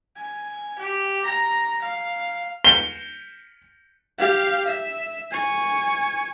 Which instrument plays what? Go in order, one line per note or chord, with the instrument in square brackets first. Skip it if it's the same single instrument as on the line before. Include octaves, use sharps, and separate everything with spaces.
[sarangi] G#5
G4
A#5
F5
[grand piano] G7
[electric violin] G4 F5
E5
G#5 C#6